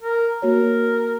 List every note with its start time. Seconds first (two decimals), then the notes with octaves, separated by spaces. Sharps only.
0.01 A#4
0.42 A#3 F#4 A#4 C#5